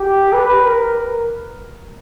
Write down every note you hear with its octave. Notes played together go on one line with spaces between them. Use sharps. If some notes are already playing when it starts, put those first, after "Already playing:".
Already playing: G4
B4
A#4